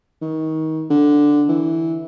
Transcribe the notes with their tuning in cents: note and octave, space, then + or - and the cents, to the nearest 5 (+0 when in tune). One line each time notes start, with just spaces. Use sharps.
D#3 +25
D3 +0
E3 -10